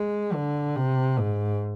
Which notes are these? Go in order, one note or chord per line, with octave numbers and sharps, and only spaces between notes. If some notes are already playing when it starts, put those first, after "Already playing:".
Already playing: G#3
D3
C3
G#2